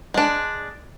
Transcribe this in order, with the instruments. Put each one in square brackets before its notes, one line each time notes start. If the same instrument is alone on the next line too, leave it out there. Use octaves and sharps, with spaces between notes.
[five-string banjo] G#3 D4